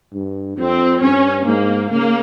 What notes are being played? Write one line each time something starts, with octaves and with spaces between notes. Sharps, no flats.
G2
F2 C4
G2 C#4
G#2 A#3
C#3 A#3